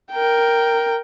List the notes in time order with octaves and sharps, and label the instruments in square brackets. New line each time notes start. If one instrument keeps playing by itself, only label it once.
[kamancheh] A#4 G5